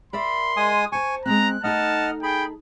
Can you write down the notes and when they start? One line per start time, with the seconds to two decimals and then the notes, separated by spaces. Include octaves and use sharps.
0.13 A#4 D5 E5 B5 C6
0.57 G#3 G#5 D#6
0.92 C5 G#5 A5 C#6
1.26 G#3 A#3 C4 A#5 F#6
1.64 A3 D#4 A4 D#5 F#5 A5 F6
2.23 G#4 G5 B5